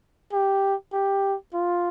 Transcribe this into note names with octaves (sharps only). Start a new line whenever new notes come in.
G4
G4
F4